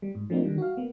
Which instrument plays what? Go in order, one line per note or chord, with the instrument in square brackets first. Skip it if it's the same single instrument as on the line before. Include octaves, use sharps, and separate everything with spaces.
[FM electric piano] G3
G#2
F3 A3 A#3 C4 D4 D#4
D3 D#3 G3
F#4 F5
A#3 B3